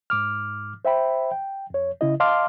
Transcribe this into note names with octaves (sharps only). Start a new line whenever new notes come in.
G#2 D6 F6
C5 E5 G5 B5
G5
F2 C#5
C#3 E4 D#5
D#5 F5 A5 C6 D6 F6